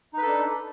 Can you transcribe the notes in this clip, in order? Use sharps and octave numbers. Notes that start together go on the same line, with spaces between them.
D4 D#4 A4 B4